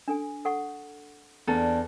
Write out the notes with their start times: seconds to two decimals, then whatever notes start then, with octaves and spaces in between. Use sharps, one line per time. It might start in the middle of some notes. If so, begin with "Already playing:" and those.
0.08 D4 A4 G#5
0.45 A4 F#5 C#6
1.47 E2 A#3 D4 A4 A#5